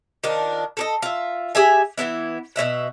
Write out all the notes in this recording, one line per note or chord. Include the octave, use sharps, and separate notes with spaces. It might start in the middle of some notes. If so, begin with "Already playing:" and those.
D#3 F3 D4 A#4
A4 A#4 D#5
F4 E5
G4 G#4 E5 G#5
E3 F#3 B3 E4
B2 C#4 E5 F#5